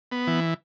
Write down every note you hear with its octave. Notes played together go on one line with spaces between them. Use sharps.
B3
E3